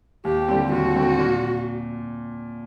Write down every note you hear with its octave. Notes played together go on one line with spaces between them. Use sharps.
D#2 G4
D3 G3 C4
D#2 F#4
D3 G3 C4
A#2